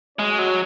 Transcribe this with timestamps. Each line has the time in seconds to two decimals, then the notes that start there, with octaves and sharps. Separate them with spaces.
0.19 G#3 C#4 F#4 C#5
0.39 F#3